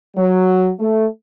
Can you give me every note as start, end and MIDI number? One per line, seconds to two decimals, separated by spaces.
0.16 0.70 54
0.80 1.06 57